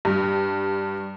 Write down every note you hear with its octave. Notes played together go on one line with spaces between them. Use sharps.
G2